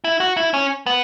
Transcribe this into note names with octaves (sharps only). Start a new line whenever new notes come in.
E4
F#4
E4
C#4
B3